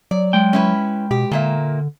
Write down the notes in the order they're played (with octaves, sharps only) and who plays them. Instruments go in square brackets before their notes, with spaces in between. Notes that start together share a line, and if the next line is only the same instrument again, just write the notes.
[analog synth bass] F#3 [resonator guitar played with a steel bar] D5
[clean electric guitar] G#3 G5
[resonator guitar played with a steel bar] C#4 E4 B4
[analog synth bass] B2 [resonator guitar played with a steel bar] G4
[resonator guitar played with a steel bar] A#2 A#3 E5 [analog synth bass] D3